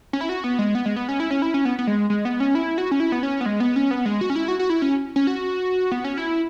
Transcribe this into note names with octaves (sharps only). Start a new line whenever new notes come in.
C#4
E4
F#4
B3
G#3
B3
G#3
B3
C#4
E4
C#4
E4
C#4
B3
B3
G#3
G#3
B3
C#4
E4
F#4
C#4
E4
B3
C#4
B3
G#3
B3
C#4
B3
G#3
F#4
C#4
E4
F#4
F#4
E4
C#4
C#4
F#4
B3
C#4
E4